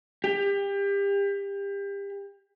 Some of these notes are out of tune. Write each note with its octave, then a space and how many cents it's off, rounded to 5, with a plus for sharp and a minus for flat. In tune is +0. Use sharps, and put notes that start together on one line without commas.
G4 +30